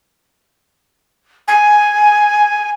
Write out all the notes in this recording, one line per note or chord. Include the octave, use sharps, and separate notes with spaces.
G#5